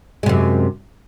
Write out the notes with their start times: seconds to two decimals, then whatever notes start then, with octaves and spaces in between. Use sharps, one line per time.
0.23 G#3
0.26 C3
0.29 F#2